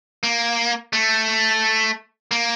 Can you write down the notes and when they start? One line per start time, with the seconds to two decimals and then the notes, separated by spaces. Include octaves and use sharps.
0.23 A#3
0.93 A3
2.31 A#3